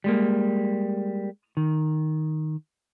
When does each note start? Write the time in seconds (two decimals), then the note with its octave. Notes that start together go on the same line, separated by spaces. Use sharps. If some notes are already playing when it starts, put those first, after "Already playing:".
0.04 G3 G#3 A#3
1.57 D#3